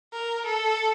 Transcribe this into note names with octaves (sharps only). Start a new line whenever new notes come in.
A#4
A4